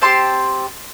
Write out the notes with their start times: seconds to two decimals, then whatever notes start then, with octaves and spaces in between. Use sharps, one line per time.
0.01 C4 E4 G4 A5 C6